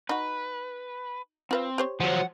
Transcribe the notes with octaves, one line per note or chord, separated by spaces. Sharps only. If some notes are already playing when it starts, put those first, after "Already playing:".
D#4 F#4 B4
C4 F4 B4 F5
G4 C5 C#5
F3 F#3 F#5